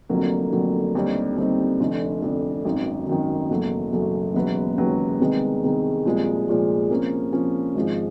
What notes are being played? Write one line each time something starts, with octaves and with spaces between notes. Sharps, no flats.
F1 F2 D3 F#3 A#3
F1 F2 D3 F#3 A#3
D#2 D3 G3 C4 D#4
D#2 D3 G3 C4 D#4
F1 F2 D3
F1 F2 D3
G#1 F#2 D#3
G#1 F#2 D#3
F#1 E2 B2 F#3 A3
F#1 E2 B2 F#3 A3
E1 D#2 C#3 F#3 B3
E1 D#2 C#3 F#3 B3
C2 C3 D#3 G#3 B3
C2 C3 D#3 G#3 B3
C2 A#2 F3 G#3
C2 A#2 F3 G#3
C3 F3 A#3 C#4
C3 F3 A#3 C#4
G#1 G#2 F3 G#3